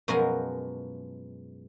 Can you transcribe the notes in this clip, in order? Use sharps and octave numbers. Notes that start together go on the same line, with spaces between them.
F#2 B2 F3 G#3 A#4 G#5